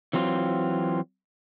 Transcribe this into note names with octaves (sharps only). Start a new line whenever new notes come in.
E3 F#3 C4 F4